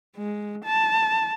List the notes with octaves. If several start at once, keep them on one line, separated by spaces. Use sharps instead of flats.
G#3
A5